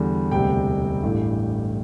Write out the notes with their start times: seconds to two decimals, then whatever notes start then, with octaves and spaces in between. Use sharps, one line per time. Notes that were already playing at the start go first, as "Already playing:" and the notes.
Already playing: E2 D3 G3
0.31 E1 D2 C3 G3 G5
1.03 A1 G2 E3 A3